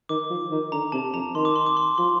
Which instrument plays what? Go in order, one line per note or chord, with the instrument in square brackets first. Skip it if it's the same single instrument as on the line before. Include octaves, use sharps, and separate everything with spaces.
[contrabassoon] D#3 [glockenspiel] D6
[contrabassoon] F3
D#3
[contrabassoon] D3 [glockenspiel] A#5
[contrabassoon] C3 [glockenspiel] A5
[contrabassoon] F2 [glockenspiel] A#5
[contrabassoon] D#3 [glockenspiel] C6
[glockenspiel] D6
C6
D6
C6
[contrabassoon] F3 [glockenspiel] C6